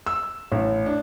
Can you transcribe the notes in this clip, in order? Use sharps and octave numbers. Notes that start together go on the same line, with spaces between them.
E6
A1
D4